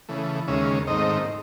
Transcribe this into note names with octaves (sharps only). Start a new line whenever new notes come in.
C#3 E3 A3
D#2 C#3 G#3 C#4 E5
G#2 D#3 A3 C4 D#4 D#5